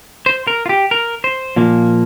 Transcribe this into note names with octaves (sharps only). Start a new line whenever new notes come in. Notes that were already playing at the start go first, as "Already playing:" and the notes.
C5
A#4
F4
G4
A#4
C5
A#2 F3 A#3